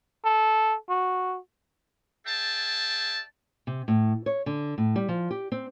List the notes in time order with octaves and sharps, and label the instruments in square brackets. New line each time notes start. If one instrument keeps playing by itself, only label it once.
[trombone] A4
F#4
[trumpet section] G#4 D5 E5 G5 A5
[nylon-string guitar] C3
A2
C#5
D3
A2
G3
F3
G4
C4